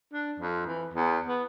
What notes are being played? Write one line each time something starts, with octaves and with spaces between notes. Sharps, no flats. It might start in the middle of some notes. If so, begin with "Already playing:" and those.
D4
F2
E3
E2
B3